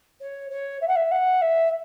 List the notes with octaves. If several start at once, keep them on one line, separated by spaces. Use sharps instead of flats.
C#5
C#5
E5
F#5
E5
F#5
E5